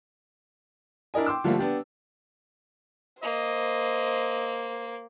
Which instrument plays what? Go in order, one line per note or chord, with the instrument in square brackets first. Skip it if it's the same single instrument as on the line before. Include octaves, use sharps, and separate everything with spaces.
[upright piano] D4 E4 A#4 D#5 G#5
G5 C6 D6 E6
D3 F3 G3 A3 A#3
B3 D4 G4
[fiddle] A#3 [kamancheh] C5 [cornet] D#5